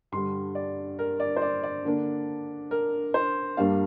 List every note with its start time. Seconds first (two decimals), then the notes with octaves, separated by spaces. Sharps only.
0.12 G2 D3 G3 C6
0.55 D5
0.99 A#4
1.20 D5
1.36 C5
1.42 D5
1.63 D5
1.85 D3 A#3 D4
2.71 A#4
3.14 C5
3.57 G2 G3 A#3 D4 F5